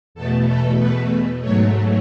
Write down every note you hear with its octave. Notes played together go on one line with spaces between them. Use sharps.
E2 B2 A3 A4
A4
B4
G#2 F#3 A3 C#5